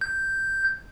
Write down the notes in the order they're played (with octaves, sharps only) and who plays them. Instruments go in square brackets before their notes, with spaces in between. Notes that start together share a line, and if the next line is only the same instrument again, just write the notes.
[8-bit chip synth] G6